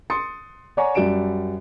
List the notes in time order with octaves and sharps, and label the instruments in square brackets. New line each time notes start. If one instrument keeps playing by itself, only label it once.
[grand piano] C6 D#6 A6 C#7
C#5 D5 F#5 G#5 A#5 C#6
F#2 G3 F#4 D5 D7 E7